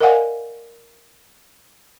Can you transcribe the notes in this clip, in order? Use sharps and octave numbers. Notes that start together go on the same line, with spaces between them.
A#4 D5 D#5 F5 F#5 G#5